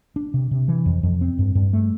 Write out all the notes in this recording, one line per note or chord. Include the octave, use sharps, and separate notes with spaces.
D4
C3
C3
E3
F2
F2
C4
G2
G2
A3